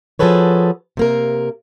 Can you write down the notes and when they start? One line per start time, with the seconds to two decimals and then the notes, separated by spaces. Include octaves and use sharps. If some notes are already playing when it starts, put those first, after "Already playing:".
0.19 F3 F#4 G#4 A4 B4 C#5
0.97 C3 A#3 A#4